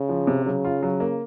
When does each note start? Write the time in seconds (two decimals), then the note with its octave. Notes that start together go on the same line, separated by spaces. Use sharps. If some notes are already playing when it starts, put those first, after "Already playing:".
Already playing: C#3
0.09 F3
0.27 C3
0.45 C#3 F#3
0.65 F4
0.83 F#3
1.00 A#3